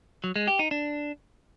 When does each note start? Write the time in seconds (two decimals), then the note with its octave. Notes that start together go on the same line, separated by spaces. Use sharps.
0.24 F#3
0.36 G#3
0.47 G4
0.59 D#4
0.71 D4